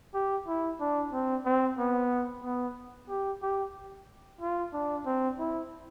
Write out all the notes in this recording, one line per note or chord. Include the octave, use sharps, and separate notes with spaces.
G4
E4
D4
C4
C4
B3
B3
G4
G4
F4
D4
C4
E4